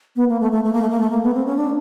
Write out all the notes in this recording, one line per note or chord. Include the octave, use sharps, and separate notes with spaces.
B3
A#3
A3
A3
A3
A#3
A3
A#3
A3
A#3
B3
C4
C#4
D4